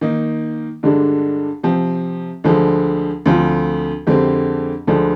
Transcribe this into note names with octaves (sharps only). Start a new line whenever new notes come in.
D#3 A#3 D#4
G2 D3 G#3 D4
C3 F3 C4
D2 D3 F3 G#3
D2 D3 F3 C4 F4
F2 D3 G#3 C4 G4
D2 D3 F3 G#3 D4